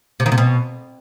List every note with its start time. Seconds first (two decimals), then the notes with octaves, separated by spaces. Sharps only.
0.20 C3
0.26 D#3
0.32 C3
0.38 B2